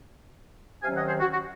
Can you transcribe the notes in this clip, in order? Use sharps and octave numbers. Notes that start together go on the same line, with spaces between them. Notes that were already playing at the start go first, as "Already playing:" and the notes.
C3 D#3 F#3 C#4 F5 G#5
D#5 F#5
G#4 C5
F#4
F#4